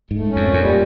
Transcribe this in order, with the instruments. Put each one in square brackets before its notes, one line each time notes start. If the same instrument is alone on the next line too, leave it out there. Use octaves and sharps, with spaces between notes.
[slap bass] G#2 [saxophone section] A3
[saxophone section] C#4
[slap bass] F2
[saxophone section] A#2
[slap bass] F2
[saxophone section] G3